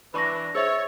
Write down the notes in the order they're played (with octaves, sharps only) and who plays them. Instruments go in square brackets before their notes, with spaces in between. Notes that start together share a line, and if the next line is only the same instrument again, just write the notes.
[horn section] E3 D4 [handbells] B4 D5 [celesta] B5 C#6 A#6
[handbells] G#4 C5 E5 [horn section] C#5 [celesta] E6 A6